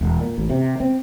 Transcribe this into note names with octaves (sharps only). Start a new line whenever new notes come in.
E1
A#2
A1
C3
C4